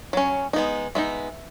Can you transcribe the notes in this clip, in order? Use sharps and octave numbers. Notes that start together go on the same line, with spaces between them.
F#3 C#4
G#3 B3 D#4
G#3 B3 D#4 E5